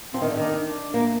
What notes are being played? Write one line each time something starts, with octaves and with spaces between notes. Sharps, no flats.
F3 C4
D#3
D3
D#3 D4
D4
A#3